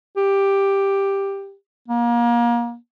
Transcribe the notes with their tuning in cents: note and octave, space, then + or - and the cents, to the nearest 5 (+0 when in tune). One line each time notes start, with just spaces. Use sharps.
G4 +5
A#3 +30